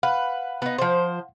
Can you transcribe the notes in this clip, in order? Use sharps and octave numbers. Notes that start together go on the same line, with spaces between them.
B4 F5 F#5
B3 D#4
F3 C5